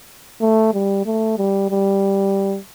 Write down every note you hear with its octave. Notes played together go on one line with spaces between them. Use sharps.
A3
G3
A3
G3
G3